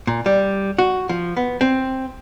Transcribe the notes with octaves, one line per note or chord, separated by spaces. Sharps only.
A#2
G3
F#4
F3
B3
C4